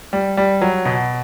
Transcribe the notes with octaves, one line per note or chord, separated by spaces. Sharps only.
G3
G3
F#3
B2